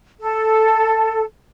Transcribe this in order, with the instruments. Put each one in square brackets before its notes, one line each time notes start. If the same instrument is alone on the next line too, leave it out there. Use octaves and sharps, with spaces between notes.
[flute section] A4